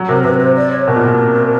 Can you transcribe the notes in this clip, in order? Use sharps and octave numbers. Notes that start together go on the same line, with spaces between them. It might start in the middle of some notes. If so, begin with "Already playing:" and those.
Already playing: F#3
C3 A#4
C3 B4
C5
D5
C#5
B2 A#4
A#2
B2